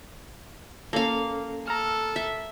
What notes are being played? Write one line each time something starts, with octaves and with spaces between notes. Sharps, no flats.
A#3 C#4 A4 F5
A4 A#5 F6
E5